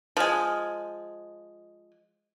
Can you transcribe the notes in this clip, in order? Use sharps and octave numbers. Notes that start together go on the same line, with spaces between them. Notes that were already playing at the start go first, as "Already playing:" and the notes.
F3 G#3